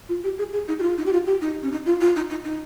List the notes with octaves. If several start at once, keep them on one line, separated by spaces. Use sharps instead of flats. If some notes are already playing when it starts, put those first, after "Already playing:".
F4
G4
G#4
G#4
D#4
G4
F4
D#4
G4
F4
G4
D#4
C#4
D#4
F4
F4
D#4
D#4
D#4